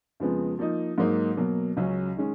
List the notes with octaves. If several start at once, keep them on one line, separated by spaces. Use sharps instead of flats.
F2 C#3 F3 G#3 B3
F3 A#3 D#4
G#2 F#3 A#3 D#4
B2 F#3 A#3
C#2 C#3 F#3 C#4
D#3 G#3 C#4